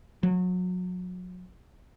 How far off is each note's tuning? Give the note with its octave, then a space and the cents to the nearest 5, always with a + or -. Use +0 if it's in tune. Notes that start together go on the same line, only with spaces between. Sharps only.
F#3 -30